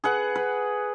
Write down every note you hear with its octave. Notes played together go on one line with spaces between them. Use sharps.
G#4 B4 F#5
B4